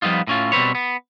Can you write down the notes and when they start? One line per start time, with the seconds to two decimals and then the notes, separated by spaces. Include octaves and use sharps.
0.02 F3 G3 B3 D#4 F4
0.27 A2 C#4 F4
0.52 B2 G3 C4 B4 C#5
0.75 B3